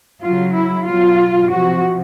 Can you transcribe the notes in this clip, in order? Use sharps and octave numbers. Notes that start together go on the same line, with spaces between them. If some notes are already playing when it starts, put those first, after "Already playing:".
C#3 F#3 F4
E4
B2 F#3 F4
C3 F3 F#4